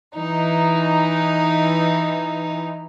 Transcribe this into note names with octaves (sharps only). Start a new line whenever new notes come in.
E3 D#4